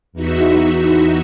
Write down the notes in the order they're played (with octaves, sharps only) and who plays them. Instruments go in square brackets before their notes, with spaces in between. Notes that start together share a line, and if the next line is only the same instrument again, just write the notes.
[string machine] E2 E3 D#4 F#4 E5